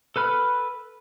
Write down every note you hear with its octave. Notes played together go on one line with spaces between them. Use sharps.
A4 B4 B5 F6